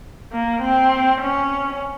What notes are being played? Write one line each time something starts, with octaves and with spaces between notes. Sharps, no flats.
A#3
C4
C#4